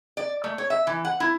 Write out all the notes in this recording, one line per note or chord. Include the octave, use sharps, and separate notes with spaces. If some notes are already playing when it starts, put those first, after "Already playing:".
D5
A3
C#5
E5
E3
F#5
E4